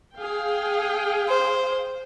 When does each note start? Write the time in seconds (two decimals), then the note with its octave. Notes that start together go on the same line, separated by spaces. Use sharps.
0.15 G#4 F5 G5
1.28 C5